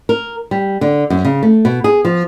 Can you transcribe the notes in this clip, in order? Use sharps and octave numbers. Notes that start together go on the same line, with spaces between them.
A#4
G3
D3
F#2
C#3
A3
B2
G#4
F3